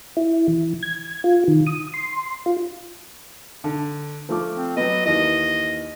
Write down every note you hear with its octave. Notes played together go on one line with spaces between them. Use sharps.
E4
E3
G#6
F4
D#3
D#6
C6
F4
D3
F3 A3 D6
C4
F#3 B3 D#5
D#2 E3 D#5